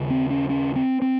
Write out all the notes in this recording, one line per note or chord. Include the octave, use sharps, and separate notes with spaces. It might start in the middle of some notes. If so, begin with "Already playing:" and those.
Already playing: D#2 C#3
C4
C#4
C#4
C4
C4